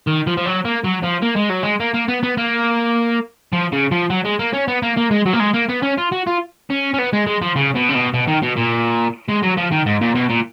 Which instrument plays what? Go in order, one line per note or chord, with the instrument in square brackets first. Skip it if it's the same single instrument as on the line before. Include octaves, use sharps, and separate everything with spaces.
[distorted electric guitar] D#3
F3
F3
F#3
A#3
F#3
F3
A#3
G#3
F#3
G#3
A#3
A#3
B3
B3
A#3
F3
C#3
F3
F#3
G#3
A#3
C#4
B3
A#3
A#3
G#3
F#3
A#3
G#3
A#3
B3
C#4
F4
F#4
F4
C#4
C#4
B3
G#3
G#3
F3
C#3
B2
C#3
B2
B2
D#3
B2
A#2
G#3
F#3
F3
D#3
G#2
A#2
B2
A#2